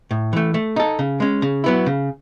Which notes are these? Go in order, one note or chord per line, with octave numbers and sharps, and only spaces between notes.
A2
E3 A3
A3
D#4 A4
C#3
G#3 C#4
C#3
F#3 B3 E4
C#3